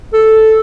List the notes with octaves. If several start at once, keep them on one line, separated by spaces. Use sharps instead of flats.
A4